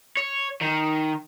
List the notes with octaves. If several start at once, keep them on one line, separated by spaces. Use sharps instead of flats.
C#5
D#3